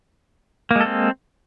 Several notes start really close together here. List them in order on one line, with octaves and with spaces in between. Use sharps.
A#3 G#3 A4 C4